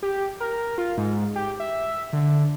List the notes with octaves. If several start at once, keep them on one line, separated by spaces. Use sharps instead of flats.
G4
A#4
F4
G#2
G4
E5
D3